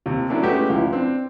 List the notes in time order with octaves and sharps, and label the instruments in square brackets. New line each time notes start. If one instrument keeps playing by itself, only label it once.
[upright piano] D#2 C3
F#3 C#4 D4 E4
G#3 A3 B3 C#4 F#4 G4
C#2 F3 E4
C4 D4